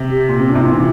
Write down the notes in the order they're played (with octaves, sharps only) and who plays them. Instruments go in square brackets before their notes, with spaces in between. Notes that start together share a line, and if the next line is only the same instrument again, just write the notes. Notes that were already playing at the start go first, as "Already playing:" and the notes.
Already playing: [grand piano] C3
[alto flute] G4
[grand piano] A#2
[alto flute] C4
[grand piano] C3 [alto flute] D4
[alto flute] E4
[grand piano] E3 [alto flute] F4